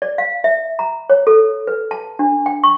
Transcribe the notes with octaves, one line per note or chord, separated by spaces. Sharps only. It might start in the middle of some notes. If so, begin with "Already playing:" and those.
D5
F5
E5
A#5
C#5
A4
B4
A5
D4
G5
C#6